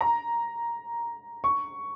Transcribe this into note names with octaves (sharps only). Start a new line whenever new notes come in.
A#5
C#6